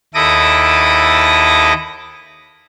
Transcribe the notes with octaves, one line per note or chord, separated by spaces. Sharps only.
D#2 E4 A4 D6 D#6 A#6